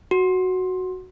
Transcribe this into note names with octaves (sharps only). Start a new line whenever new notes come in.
F#4